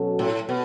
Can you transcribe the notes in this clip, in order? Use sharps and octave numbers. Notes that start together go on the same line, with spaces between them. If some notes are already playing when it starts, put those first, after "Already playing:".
Already playing: B2 F#3 C#4 F#4 A4
A2
B2